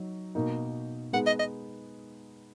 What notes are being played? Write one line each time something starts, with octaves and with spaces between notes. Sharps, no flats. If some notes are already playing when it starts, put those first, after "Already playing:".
Already playing: F#3 D#4
B2 A#3 D#4
G#3 B3 D#4 G#4 F#5
D#5
D#5